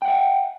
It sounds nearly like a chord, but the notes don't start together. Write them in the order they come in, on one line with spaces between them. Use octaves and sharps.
G5 F#5 E5